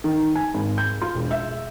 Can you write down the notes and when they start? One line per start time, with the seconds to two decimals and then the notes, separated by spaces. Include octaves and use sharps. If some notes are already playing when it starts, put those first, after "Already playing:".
0.04 D#3
0.36 G#5
0.54 G#1
0.78 G6
1.02 F4
1.15 E1
1.31 E5